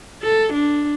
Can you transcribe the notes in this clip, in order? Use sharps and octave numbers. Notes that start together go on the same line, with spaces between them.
A4
D4